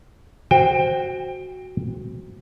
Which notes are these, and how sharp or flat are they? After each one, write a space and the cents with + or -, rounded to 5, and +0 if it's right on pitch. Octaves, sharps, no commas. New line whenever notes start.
F#4 +0 C5 +0 G5 +20